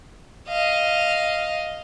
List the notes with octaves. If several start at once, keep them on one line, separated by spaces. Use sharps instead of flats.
D#5 F5